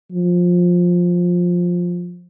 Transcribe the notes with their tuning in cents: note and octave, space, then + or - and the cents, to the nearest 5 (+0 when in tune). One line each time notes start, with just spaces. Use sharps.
F3 +15